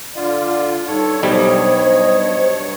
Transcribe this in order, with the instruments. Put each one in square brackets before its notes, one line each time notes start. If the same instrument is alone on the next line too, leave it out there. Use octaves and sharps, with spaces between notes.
[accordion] D3 F4 [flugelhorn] D5
[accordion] G2 C#5 [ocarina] D#4 [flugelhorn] A4
[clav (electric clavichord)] B1 G3 [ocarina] C5 [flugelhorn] D#5